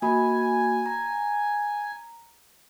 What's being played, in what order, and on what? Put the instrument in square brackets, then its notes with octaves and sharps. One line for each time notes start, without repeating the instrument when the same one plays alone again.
[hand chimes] A#3 F#4 B5 [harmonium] G#5
[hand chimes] A#5